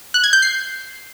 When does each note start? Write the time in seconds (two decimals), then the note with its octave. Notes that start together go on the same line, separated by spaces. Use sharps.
0.14 F#6
0.24 G#6
0.33 G6
0.42 C7